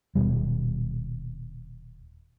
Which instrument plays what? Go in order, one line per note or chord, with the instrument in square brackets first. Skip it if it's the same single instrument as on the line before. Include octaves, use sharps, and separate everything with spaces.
[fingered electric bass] D#1 C#2 B2 G3